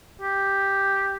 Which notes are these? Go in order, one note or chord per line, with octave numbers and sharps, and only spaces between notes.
G4